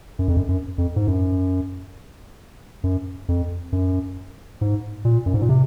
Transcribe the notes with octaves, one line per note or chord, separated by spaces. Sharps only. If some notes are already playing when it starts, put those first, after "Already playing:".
F#2
F2
F#2
F#2
F2
G#2
F#2
F#2
F2
F#2
G#2
A#2
F#2
G#2
A#2
C3